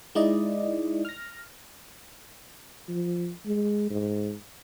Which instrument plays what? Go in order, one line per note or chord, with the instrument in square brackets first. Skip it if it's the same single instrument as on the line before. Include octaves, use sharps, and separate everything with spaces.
[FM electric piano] G#3 D#4 E4 D5 D#5
F6 A#6
[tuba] F3
G#3
G#2